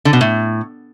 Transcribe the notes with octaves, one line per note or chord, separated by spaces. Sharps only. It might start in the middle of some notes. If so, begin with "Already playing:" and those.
D3
B2
A2